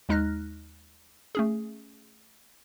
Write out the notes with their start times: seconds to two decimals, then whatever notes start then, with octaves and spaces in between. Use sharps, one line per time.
0.09 D#2 G#3 D#4 F6 F#6 A#6
1.35 A3 C#4 G#4